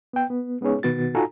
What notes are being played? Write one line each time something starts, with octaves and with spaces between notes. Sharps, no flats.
B3 G5
B3
G#3 B3 C#4 D#4 G#4 C#5
B2 D#3 B3 F#4 A6
D#4 F4 F#4 A4 G#5 A#5